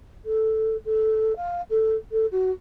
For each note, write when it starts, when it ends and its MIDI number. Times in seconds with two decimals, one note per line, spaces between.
0.25 0.76 69
0.85 1.36 69
1.36 1.61 77
1.70 1.95 69
2.11 2.26 69
2.31 2.51 66